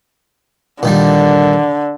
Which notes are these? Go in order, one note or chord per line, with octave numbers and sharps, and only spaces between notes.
A#2 D3 D#3 G3